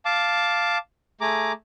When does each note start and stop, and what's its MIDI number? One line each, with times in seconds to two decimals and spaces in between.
0.05 0.78 77
0.05 0.78 81
0.05 0.78 86
1.21 1.52 57
1.21 1.52 68
1.21 1.52 82
1.21 1.52 86